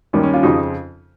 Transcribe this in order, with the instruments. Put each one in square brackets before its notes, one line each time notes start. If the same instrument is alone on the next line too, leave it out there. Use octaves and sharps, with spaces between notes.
[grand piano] D#2 D#3 G3 C#4
C#4
C#4 F4
F2 C#3 F3 D#4 G4